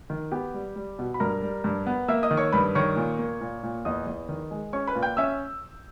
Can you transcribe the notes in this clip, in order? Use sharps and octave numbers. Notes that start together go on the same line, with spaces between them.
D#3
B3 G4 G5
G3
G3
B2
B5
G2 A#4 A#5
G3
G2
B3
A#3 E5 E6
D#5 D#6
D#3
C#5 C#6
G2 B4 B5
D#3 C#5 C#6
A#2
A#3
A#2
A#2
E2 D#5 D#6
E2
D#3
G#3
C#4 C#5 C#6
B4 B5
A#2
G5 G6
C#4 E5 E6